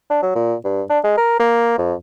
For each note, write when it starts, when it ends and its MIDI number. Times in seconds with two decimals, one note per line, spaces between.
0.10 0.20 62
0.23 0.33 54
0.35 0.55 46
0.65 0.82 43
0.90 0.99 62
1.04 1.15 56
1.17 1.38 70
1.39 1.77 58
1.78 1.94 41